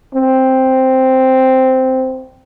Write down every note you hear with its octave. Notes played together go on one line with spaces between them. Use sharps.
C4